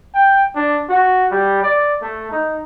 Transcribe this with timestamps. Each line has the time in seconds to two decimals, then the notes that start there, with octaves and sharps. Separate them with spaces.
0.14 G5
0.56 D4
0.89 F#4
1.31 G3
1.63 D5
2.02 A3
2.32 D#4